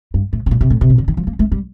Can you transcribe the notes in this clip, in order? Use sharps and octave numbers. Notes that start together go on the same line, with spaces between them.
G2
A2
C3
A#2
C3
A2
C3
A#2
D3
D#3
F3
A#3
A3
G3